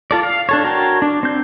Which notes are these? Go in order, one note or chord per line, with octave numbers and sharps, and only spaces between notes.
F4 A4 D5
F5
D4 A4 C#5
F#4 A#4 C#5 G5 A5
D4
C4 G6